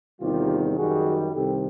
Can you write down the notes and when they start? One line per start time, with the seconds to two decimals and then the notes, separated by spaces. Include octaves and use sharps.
0.21 E2 C3 D#3 G3 F4 G4
0.77 F#2 D#3 G3 F#4 G#4
1.33 C2 C3 D#3 G3 G4 A4